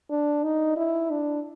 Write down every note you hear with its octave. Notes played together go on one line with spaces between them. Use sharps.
D4
D#4
E4
D4